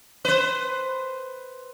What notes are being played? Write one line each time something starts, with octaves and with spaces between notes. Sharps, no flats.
B4 C5